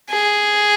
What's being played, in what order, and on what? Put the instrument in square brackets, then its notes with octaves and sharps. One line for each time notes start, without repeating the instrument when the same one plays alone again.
[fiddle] G#4